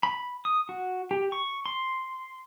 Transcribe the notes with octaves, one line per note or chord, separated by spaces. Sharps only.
B5
D#6
F#4
G4
C#6
C6